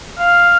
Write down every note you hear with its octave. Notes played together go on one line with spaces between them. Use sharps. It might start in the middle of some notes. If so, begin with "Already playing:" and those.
F5